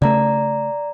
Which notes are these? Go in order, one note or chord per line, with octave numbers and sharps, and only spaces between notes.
C#3 A3 D5 A#5